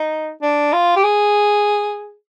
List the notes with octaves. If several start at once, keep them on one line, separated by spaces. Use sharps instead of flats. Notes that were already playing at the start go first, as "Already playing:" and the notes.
Already playing: D#4
D4
F4
G4
G#4